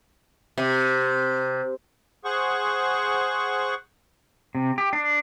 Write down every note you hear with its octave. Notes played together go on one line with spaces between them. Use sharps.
C3
G#4 C5 F#5 C#6
C3
G4
D4